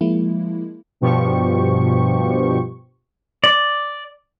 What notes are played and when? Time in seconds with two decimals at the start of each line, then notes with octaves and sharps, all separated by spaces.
0.01 F3 G#3 A#3 E4
1.01 G2 B2 F3 G4 C#6
3.44 D5